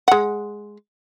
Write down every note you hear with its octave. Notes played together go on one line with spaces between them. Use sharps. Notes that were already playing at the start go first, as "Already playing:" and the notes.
G#3 F#5